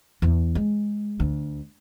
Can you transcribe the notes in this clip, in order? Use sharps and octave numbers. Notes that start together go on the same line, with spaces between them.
E2
G#3
D2